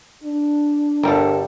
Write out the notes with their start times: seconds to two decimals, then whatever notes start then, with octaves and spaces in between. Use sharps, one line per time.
0.24 D4
1.03 G1 G3 A4 A#4